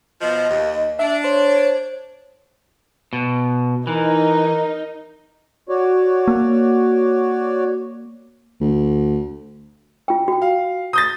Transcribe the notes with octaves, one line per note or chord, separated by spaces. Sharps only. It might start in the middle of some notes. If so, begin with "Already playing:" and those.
B2 F3 D#5
D#2
D4 E5
C5 C#5
B2
E3 D#4 A#4
F#4 C#5 D5
A#3
D2
F4 G5
F#4 G5
F5
D#6 G6 A6